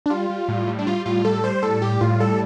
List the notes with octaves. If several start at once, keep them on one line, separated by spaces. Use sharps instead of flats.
D4
G3 F4
G3
A2
G3
D4
G3 F4
A2 F4
G3 A4
G3 C5
A2 A4
G3 G4
A2 F4
G3 A4